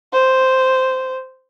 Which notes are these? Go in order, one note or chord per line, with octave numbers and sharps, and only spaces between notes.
C5